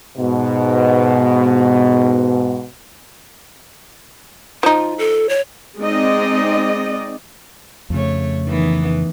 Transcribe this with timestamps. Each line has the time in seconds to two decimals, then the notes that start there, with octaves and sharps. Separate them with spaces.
0.18 G#2 B2
4.63 F3 D#4 F4
4.99 A4
5.29 C#5
5.81 G#3 C4 D#4 D5 D#5
7.90 F2 C#3 A3 C#5
8.47 D#3 E3 B3